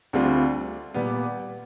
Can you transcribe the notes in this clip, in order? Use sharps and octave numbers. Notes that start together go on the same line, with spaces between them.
D2 D3 G3 C4 F4
A#2 G3 B3